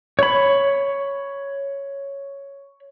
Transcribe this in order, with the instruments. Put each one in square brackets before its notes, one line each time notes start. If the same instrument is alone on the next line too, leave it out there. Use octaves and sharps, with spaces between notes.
[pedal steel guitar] C#5 B5